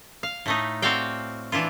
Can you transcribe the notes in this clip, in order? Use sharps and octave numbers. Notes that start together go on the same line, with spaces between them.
F5
A2 A3 D#4
C4 F#4 A4 D5 F5 G5
E3 D4 E4 F4